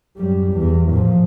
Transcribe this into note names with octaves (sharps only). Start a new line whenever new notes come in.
F#2 G3
E2
A#2 F3